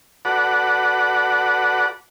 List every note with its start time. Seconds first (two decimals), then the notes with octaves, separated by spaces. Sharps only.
0.25 F#4 A4 B4 D5 F#5